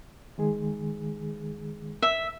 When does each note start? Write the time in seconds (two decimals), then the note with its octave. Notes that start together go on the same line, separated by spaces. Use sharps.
0.38 D#3 G#3 G#4
2.02 E5